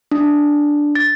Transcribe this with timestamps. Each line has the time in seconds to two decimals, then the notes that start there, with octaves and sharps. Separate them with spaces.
0.11 D4
0.95 A6